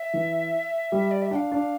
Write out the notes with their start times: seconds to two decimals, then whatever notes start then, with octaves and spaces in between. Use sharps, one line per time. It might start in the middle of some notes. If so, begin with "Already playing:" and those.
Already playing: E5
0.14 E3
0.92 G3
1.11 D5
1.22 E5
1.31 D4 G5
1.36 F5
1.52 D4